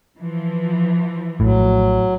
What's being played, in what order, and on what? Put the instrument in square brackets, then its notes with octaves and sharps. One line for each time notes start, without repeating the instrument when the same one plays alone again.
[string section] E3 F3
[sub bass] A#1 [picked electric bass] A2 [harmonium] F#3